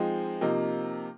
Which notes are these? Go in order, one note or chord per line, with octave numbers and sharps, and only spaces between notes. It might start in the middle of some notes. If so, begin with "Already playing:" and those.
Already playing: F3 G#3 C4 D#4
C3 F3 A#3 D#4